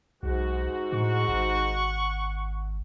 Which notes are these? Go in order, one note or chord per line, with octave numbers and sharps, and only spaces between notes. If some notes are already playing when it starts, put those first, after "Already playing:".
B1 G#2 F#4
A2 F#5 C#6
G#1